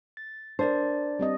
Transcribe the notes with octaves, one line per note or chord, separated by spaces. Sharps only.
A6
D4 A#4 C5 D5
G3 C4 D#5